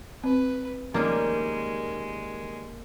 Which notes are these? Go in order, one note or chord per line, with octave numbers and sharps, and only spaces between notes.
C4 B4
D#3 G3 G#3 A#3 C#4